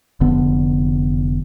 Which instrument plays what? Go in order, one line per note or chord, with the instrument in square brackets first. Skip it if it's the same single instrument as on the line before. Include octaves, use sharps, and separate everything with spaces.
[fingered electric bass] F1 D3 B3